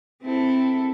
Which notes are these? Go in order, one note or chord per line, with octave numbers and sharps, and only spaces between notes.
C4 E4 A4